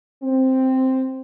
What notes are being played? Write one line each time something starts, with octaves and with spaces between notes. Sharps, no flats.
C4